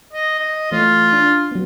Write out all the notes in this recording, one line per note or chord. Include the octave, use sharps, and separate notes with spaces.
D#5
D#5
E3 A3 F4 C#5
D4
F#3 B3